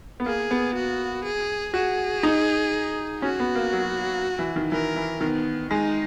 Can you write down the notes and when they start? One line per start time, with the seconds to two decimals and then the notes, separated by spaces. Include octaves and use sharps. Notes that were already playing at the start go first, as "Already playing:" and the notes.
0.20 B3
0.26 A#3 G#4
0.51 B3
0.75 F#4
1.25 G#4
1.74 F#4 G#4
2.23 D#4
3.22 C#4 F#4
3.40 B3
3.55 A#3
3.73 F#3
4.39 E3
4.56 D#3
4.72 E3 A#4
4.96 E3
5.21 D#3 B3
5.71 G#3 D#4